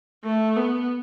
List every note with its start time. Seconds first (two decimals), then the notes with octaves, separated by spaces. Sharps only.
0.24 A3
0.56 B3